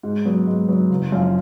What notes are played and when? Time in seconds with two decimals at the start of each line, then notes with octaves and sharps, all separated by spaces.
0.03 G#2
0.25 F#3 B3
0.47 G#2
0.68 F#3 B3
0.90 F#1
1.12 F#2 F3